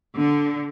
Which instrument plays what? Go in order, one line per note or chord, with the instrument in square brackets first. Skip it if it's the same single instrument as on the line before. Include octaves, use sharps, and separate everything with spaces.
[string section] D3